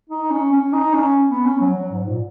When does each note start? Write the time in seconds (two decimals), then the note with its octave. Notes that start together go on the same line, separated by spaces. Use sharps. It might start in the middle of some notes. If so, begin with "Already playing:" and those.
0.10 D#4
0.31 C#4
0.52 C#4
0.73 D#4
0.94 C#4
1.30 B3
1.45 C#4
1.61 F#3
1.76 F#3
1.92 G#2
2.08 A#2